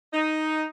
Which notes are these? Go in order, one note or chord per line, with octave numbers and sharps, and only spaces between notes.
D#4